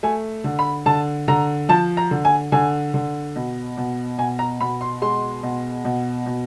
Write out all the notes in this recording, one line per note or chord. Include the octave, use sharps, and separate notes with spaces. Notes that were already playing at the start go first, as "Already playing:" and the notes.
A3 G#5
D3
B5
D3 A5
D3 A#5
F3 A5
A#5
D3
G#5
D3 G#5
D3
B2
B2
B2 G#5
A#5
B2 B5
C6
G#3 C6
B2
B2
B2